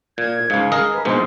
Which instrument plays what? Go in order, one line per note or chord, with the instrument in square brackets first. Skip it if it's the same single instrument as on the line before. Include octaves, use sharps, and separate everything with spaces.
[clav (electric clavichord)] A#2 [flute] G#6
[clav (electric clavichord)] C#2 G#2 [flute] F5
[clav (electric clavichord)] G#4 A#4 D#5
[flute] B4
[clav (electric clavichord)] A#1 G#2 B2 [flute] C5